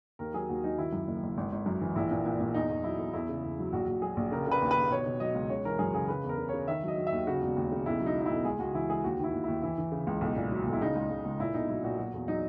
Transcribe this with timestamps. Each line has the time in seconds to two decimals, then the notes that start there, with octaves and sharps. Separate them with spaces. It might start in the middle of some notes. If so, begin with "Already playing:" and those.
0.19 D#2 A#4
0.34 F#3 G#4
0.49 D#2 F#4
0.64 F#3 D#4
0.78 D#3 E4
0.93 F#2
1.08 F#1
1.23 F#1
1.37 G#1
1.52 G#1
1.66 F#2
1.81 E3
1.96 A#1 E4
2.11 A#2
2.26 A#2
2.40 A#2
2.54 E2 D#4
2.70 E2
2.84 F#3 E4
2.99 E2
3.14 E2 E4
3.29 C#3
3.44 E2
3.59 F#3
3.73 A#1 F#4
3.88 A#1
4.02 F#3 G#4
4.17 A#1
4.31 C#3 A#4
4.47 C#3 B4
4.62 D#2
4.71 B4
4.76 D#2
4.90 B2 C#5
5.06 B2
5.20 F#3 D#5
5.35 C#2
5.49 C#3 C#5
5.65 E3 A#4
5.79 F#2 G#4
5.94 C#3 G#4
6.08 C#3 B4
6.24 E2
6.29 A#4
6.38 C#3
6.49 C#3 C#5
6.68 D#3 E5
6.83 F#3
6.88 D#5
6.97 F#3
7.07 E5
7.12 D#2
7.27 C#3 F#4
7.42 E1
7.56 D#2
7.71 C#3
7.86 B1 E4
8.01 F#3
8.06 D#4
8.16 F#3
8.21 D#4
8.26 B1 E4
8.44 C#2 G#4
8.59 C#2 F#4
8.74 E3 E4
8.90 C#2 G#4
9.04 D#2 F#4
9.19 D#3 E4
9.33 D#2
9.44 D#2 E4
9.62 E3 E4
9.78 E3
9.92 C#3
10.07 C#2
10.21 B1
10.36 A#2
10.51 F#3
10.66 B1
10.73 E4
10.81 C#3 D#4
10.96 C#2
11.10 C#2
11.25 C#2
11.40 A#2 E4
11.54 B1 D#4
11.69 F#3 E4
11.83 A#2 F#4
11.98 F#3 F#4
12.14 E2
12.28 F#3 D#4